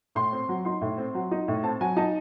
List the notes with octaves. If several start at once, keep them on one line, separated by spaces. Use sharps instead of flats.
A2 C6
C4
F#3
D#4 C6
A2
C4
F#3
D#4
A2
C4 A5
F#3 G#5
D#4 A5